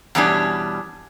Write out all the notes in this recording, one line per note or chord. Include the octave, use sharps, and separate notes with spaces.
E2 B2 G3 C#4 D4